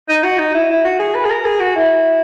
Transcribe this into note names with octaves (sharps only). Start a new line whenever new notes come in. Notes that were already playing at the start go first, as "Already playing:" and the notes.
D#4
F#4
D#4
E4
E4
F#4
G#4
B4
G#4
A#4
G#4
F#4
E4